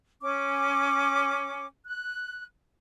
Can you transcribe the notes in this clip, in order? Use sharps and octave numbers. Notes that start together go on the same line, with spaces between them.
C#4 D6
F#6